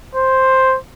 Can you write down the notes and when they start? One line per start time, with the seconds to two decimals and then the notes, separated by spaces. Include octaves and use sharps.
0.15 C5